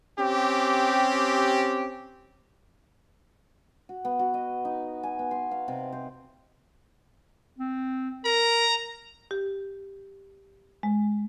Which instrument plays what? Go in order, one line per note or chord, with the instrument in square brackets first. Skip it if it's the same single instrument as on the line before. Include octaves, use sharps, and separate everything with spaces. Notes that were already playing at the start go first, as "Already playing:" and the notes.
[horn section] C4 C#4 G4
[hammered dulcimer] F#4
B3
F#4
D#5
D#4
G#5
B3
C6
F5
C3
C5
[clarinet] C4
[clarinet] A#4 [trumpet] A#5
[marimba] G4
G#3